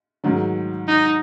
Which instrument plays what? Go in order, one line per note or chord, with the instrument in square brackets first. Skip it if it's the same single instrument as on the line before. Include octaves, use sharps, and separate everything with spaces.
[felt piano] G#2 D#3 F#3
[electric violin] D#4